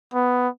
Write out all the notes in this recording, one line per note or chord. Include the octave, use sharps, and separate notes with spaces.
B3